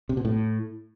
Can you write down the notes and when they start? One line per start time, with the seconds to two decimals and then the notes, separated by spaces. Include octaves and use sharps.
0.09 C3
0.17 B2
0.25 A2